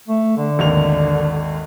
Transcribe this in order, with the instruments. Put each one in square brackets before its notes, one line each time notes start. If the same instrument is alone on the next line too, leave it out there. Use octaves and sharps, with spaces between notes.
[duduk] A3
D3
[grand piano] G#1 D#2 F7